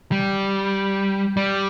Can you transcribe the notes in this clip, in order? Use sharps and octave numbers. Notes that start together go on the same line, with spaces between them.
G3
G3